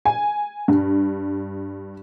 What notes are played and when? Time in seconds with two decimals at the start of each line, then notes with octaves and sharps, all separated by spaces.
0.05 G#5
0.68 G2